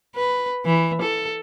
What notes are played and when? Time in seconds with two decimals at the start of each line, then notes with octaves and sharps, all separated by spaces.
0.15 B4
0.65 E3
1.02 A4